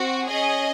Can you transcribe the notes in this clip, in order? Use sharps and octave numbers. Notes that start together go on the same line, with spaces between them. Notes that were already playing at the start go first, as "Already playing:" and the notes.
Already playing: C4 F#4
C#4 G#4 D#5